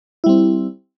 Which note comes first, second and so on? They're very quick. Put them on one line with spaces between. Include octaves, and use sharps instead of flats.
E4 G3 C4